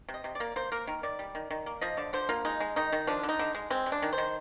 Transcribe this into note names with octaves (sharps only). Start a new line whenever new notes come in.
C3
D#5
C3
D5
A#3
A#3 C5
A#3 A#4
D#3 A#4
D#3 D5
G3
D#3
D#3
A#3
F3 D#5
D3 D5
D3 C5
A#3 F4
G#3 D#4
G#3
D#3 D#4
D#3
F3 D4
D3
D#4
D3
G#3
G#3 C4
G#3
D4
D#3
C5
D#3